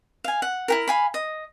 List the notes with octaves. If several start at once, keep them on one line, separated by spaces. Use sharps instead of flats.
F5 G#5
F#5
E4 G4 A#4
F5 G#5 B5
D#5